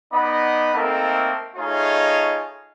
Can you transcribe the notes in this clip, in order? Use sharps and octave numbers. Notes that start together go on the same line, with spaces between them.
B3 D#4 D5 D#5 F#5 B5
A3 A#3 C4 D#4 A4 A#4
A3 D#4 F4 G#4 C#5 D#5